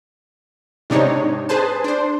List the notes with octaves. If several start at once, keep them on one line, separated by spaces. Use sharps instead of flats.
G#2 C3 D4 D#4 C#5
G#4 B4 C5 A5
D4 C5